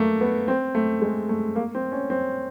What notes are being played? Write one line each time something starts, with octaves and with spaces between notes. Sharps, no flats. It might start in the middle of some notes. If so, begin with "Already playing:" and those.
Already playing: A3 A#3
B3
C4
A3
G#3
A3
A#3
C4
C#4
C4